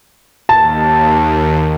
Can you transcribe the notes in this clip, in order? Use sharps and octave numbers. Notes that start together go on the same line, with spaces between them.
D#2 A5